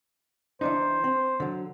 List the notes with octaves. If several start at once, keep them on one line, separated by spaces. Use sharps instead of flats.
E3 D4 D#4 C5
C4
D3 F#3